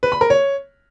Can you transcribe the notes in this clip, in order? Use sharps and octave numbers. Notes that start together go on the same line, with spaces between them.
B4
B5
A#4
C#5